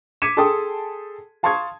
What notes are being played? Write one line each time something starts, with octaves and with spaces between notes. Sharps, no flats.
D6 G#6 B6 C#7 D#7 E7
G#4 A4 G5 A5 C6 D#6
F5 A5 C6 C#6 D#6 G#6